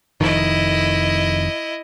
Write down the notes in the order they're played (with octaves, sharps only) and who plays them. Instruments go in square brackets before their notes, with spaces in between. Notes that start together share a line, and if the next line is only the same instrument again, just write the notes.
[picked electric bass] F1 F2 D#3 [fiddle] E4 D#5